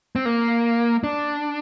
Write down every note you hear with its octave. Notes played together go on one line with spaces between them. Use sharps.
C4
A#3
D4